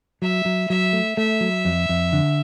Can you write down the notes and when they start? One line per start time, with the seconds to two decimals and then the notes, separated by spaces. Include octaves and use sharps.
0.22 F#3 E5
0.45 F#3
0.69 F#3 E5
0.93 A3
1.17 A3 E5
1.41 F#3
1.65 F2
1.89 F2
2.13 D3